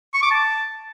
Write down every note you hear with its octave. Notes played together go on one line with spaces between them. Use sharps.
C#6
D6
A5